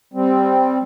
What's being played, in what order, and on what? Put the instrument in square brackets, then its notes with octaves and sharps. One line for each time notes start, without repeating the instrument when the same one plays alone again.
[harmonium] G3 C4